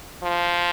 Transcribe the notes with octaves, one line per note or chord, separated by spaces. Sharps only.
F3